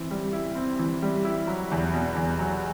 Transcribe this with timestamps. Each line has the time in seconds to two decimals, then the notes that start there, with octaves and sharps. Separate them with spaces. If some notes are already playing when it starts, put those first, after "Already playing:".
Already playing: E3 C4
0.11 G3
0.33 E4
0.55 C4
0.79 E3
1.02 G3
1.25 E4
1.47 F#3
1.71 E2
1.93 B2
2.16 E2
2.39 F#3